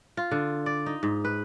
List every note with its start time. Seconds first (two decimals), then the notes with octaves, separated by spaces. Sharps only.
0.17 F4
0.31 D3
0.66 D5
0.86 D#4
1.03 G#2
1.25 B4